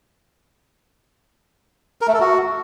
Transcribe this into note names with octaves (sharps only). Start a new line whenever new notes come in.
A#4
A3
A4
F#4